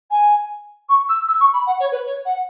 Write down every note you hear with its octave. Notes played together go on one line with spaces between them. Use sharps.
G#5
C#6
E6
E6
C#6
B5
F#5
C#5
B4
C#5
F#5